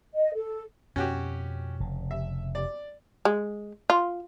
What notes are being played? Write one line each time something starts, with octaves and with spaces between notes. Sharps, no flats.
D#5
A4
F2 B2 C#4 F#4 G4
F1 C#3
E5
D5
G#3
F4